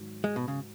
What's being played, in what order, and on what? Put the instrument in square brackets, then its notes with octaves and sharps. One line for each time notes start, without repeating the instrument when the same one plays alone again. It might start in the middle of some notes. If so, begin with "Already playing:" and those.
Already playing: [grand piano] G#2 D#3 F#3
[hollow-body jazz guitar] G#3
B2
C#3